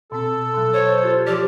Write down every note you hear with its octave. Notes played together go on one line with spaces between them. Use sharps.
B2 C4 A4
B2 F#3
C5 C#5
F4 G4
F3 G4 D5 F6